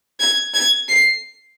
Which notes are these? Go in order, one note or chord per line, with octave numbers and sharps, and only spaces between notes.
G#6
G#6
C7